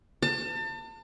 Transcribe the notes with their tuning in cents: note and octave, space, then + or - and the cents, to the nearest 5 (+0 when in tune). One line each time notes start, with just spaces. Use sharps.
A5 +35